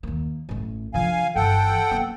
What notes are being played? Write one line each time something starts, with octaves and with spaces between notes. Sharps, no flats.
D#2 A#3
A1 A3
D3 F3 F5 G#5
G1 E3 A4 F#5 G5
A#3 B3